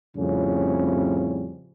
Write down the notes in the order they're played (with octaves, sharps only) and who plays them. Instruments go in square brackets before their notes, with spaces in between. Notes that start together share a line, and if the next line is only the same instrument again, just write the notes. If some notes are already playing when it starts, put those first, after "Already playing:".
[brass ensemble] F2 A2 C#3 G3 C4 C#4